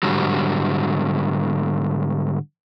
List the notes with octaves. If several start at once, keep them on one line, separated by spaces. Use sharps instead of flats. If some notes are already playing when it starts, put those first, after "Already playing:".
G#2 D3 F#3 G3